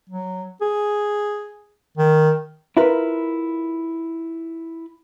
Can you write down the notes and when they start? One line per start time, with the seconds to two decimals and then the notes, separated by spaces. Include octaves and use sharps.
0.10 F#3
0.62 G#4
1.98 D#3
2.77 E4 F4 A#4 B4